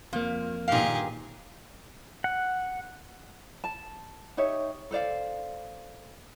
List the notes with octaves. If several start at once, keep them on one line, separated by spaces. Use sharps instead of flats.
F2 F3 A#3
G2 A#2 D#3 D#4 G4 G#4 F5
F#5
A5
D#4 G4 C#5 E5
A4 C5 D5 F5